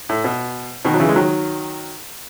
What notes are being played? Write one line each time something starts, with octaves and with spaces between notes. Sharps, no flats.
A2
B2
B2 D#3
F#3
C#3 E3
G#3
D#3 F#3